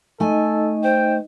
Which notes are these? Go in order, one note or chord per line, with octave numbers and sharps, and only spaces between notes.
A3 D#4 A4 D#5 G#5
C5 G5